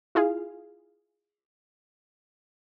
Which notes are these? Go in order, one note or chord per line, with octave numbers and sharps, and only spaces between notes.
E4 F4 G#4 F5